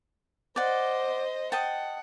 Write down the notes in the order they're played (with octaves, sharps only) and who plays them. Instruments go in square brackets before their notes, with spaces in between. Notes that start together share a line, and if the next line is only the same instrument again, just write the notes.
[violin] C5 D#5 [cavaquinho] D5 F#5
[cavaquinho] D#5 G5 A5 [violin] F#5